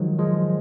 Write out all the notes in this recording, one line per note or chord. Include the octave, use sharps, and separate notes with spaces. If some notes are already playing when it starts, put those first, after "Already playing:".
Already playing: D#3 F3 F#3 G#3
F3 G#3